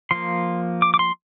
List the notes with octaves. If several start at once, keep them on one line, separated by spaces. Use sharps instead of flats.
F3 A#3 C6
D6
D6
C6